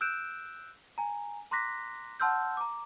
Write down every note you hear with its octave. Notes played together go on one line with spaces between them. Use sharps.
E6 F#6 G6 D7 E7
G#5 A#5
A#5 C6 D6 F#6 A#6 B6
F#5 A5 C6 E6 F6 G6
A#5 D6